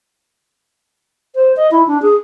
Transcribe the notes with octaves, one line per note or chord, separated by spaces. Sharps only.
C5
D#5
E4
D4
G#4